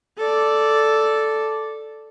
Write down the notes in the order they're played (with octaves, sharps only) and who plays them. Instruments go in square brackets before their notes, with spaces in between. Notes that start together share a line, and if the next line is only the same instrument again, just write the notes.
[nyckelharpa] A4 D5